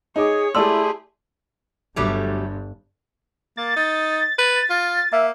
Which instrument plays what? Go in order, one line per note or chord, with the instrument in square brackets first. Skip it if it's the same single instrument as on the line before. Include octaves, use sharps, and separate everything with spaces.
[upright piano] D#4 D6 [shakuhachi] G#4 [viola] C#5
[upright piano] A3 D5 E6 [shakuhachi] E4 [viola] G4 G#4 [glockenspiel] A5 C6
[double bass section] G1 G2 [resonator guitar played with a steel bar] F#3 G3 A3
[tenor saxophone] A#3 [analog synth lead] A6
[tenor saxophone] D#4
B4
F4
[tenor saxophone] A#3 [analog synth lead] E5